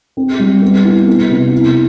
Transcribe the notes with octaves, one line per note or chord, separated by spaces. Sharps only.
C4
G3
B3
E4
B3
C3
E4